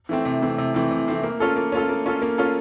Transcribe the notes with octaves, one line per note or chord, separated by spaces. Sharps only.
E3 A3 C4
C3
E3 A3 C4
C3
E3 A3 C4
C3
E3 A3 C4
A#3
C#4 F4 A4
A#3
C#4 F4 A4
A#3
C#4 F4 A4
A#3
C#4 F4 A4